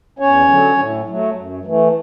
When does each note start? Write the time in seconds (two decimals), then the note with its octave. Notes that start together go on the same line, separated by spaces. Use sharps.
0.19 E2 C#4 C#5
0.48 D3 F#3
0.78 A2
1.07 F#3 A3
1.36 F#2
1.65 E3 A3